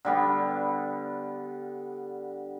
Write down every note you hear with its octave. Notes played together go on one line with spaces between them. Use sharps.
D3 G3 B3